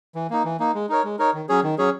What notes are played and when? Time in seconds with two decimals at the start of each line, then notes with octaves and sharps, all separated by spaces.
0.15 E3
0.30 A#3 D#4
0.45 E3
0.60 A#3 D#4
0.74 G#3
0.89 D#4 A#4 C#5
1.04 G#3
1.19 D#4 A#4 C#5
1.34 D#3
1.49 F#3 C#4 G#4 C#5
1.63 D#3
1.78 F#3 C#4 G#4 C#5